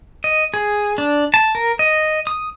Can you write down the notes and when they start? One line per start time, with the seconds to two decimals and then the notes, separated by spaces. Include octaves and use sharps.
0.24 D#5
0.54 G#4
0.98 D4
1.34 A5
1.55 A#4
1.79 D#5
2.27 D#6